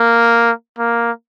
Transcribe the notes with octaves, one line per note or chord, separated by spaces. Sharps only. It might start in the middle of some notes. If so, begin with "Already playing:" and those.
Already playing: A#3
A#3